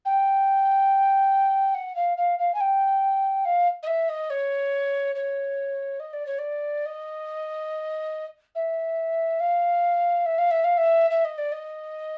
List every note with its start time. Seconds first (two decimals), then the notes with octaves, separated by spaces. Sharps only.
0.05 G5
1.74 F#5
1.95 F5
2.17 F5
2.38 F5
2.54 G#5
2.60 G5
3.45 F5
3.83 D#5
3.87 E5
4.09 D#5
4.30 C#5
5.15 C#5
5.99 D#5
6.13 D5
6.26 C#5
6.38 D5
6.85 D#5
8.55 E5
9.40 F5
10.25 E5
10.38 F5
10.50 E5
10.64 F5
10.77 E5
11.10 E5
11.24 D#5
11.38 D5
11.52 D#5